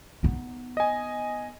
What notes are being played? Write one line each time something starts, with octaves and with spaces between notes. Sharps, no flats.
B3 D#4
D#5 G#5